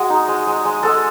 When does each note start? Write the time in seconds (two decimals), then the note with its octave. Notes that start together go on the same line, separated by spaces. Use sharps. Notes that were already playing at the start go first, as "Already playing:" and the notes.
Already playing: G#3 F#4 G#4
0.10 D#4
0.28 G#3
0.47 G#3
0.65 G#3
0.83 G#3 A4